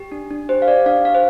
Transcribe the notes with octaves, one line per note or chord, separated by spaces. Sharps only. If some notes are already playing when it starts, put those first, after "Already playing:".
Already playing: G4
D4
D4
G4 C5
F5
G4 D5
D4 F5
G4 F5
C5